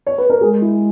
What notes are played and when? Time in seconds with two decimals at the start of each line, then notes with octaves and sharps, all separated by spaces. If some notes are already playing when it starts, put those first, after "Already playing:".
0.06 C#5
0.18 B4
0.30 A#4
0.41 G#3 G#4
0.62 E4